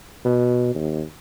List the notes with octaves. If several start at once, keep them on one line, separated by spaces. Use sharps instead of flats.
B2
D#2